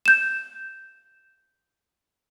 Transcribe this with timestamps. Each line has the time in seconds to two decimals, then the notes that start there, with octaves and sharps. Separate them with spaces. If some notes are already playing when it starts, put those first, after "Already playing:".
0.06 G6 E7